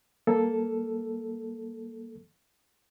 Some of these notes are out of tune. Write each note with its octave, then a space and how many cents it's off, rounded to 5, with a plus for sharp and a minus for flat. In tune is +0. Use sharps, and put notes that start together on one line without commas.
G3 +0 A#3 +0 A4 +0